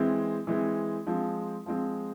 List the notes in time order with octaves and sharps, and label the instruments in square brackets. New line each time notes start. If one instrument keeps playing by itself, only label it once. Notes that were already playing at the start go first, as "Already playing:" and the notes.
Already playing: [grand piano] E3 G#3 C4
E3 G#3 C4
F3 G#3 C4
F3 G#3 C4